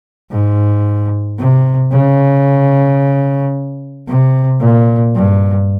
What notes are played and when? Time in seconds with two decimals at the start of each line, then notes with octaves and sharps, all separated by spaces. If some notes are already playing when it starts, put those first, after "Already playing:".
0.32 G#2
1.39 C3
1.93 C#3
4.08 C3
4.61 A#2
5.16 G2